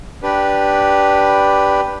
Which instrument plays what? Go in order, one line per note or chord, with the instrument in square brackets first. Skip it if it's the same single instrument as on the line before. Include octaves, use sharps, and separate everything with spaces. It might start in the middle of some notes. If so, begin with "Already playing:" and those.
[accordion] D4 G4 B4